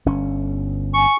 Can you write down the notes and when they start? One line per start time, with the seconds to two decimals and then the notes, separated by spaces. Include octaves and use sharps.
0.06 G1 C#4
0.94 G#5 C#6